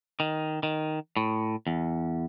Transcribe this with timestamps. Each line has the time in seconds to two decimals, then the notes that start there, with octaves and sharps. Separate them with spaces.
0.20 D#3
0.63 D#3
1.17 A2
1.67 E2